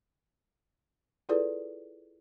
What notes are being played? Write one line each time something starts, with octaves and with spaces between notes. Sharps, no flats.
E4 F4 G#4 A4 B4 D5